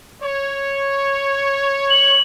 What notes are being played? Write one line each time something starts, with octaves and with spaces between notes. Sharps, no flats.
C#5
F#7